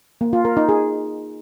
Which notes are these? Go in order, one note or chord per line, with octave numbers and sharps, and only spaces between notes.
A#3
F4
A#4
D#4
G#4